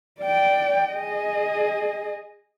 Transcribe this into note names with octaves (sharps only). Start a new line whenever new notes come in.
D5 G5
G#4 D#5